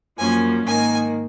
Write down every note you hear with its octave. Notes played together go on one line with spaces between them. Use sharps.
F#2 F3 A#3 C#4 G#5
G#2 D#3 A#3 G#5